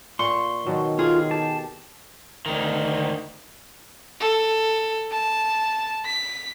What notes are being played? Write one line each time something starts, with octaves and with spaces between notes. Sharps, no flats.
A#2 C6 C#6
B2 D#3 F#3
F4 G#4
G4 A5
D2 D#3
A4
A5
B6